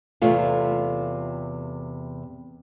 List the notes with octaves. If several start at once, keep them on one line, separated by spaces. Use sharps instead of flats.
E2 C3 A3 F4